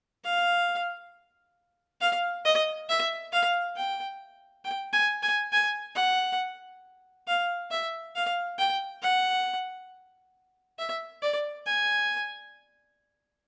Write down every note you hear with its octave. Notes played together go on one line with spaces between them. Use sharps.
F5
F5
D#5
E5
F5
G5
G5
G#5
G#5
G#5
F#5
F5
E5
F5
G5
F#5
E5
D5
G#5